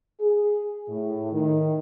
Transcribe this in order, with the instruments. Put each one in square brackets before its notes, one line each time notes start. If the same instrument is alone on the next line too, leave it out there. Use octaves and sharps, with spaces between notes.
[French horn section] G#4
A2
D#3